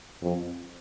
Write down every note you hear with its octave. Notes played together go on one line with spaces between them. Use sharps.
F2